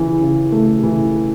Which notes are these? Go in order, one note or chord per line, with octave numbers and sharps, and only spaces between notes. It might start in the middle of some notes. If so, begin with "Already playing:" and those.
Already playing: C#3 E3
C#3
A3
E3